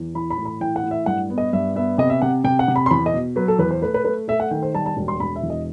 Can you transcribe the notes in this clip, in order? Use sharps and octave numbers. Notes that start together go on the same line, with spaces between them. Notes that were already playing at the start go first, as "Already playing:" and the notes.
Already playing: E2
E3 B5
B5
A2
B5
E3 G5
F#5
A2
E5
G2 F#5
B3
D#5
G2 E5
B3 E5
C3 D#5
E5
C3 F#5
C3 G5
F#5
C3
B5
C6
E2 B5
D#5
B2
F#3 B4
A4
E2 B4
C5
A3 B4
B4
A3 B4
A3 E5
F#5
D#3 G5
C5
G3 A5
A5
E1
C6
E1 B5
E5
E2
D#5